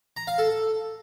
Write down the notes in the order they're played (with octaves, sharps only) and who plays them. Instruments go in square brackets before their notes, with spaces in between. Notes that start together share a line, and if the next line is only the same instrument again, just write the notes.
[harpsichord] A#5
F5
A4